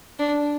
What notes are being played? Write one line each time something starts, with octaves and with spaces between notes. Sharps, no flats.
D4